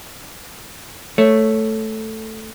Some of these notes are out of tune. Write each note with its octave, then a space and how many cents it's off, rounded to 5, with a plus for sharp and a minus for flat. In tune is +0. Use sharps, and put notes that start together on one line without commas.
A3 +0 C#5 +0